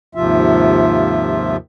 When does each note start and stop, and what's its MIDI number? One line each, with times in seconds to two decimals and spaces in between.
0.15 1.56 39
0.15 1.56 44
0.15 1.56 48
0.15 1.56 53
0.15 1.56 65
0.15 1.56 76